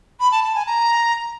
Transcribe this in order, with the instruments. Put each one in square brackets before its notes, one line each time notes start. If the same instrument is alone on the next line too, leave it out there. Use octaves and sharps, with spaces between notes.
[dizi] B5
A5
A5
G#5
A#5